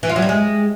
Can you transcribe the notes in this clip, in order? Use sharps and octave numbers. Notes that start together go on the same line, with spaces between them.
E3
F4
F#3
G3
G#3